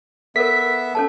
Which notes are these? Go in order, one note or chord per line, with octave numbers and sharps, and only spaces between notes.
B3 A4 A#4 E5 B6
C#4 A4 A5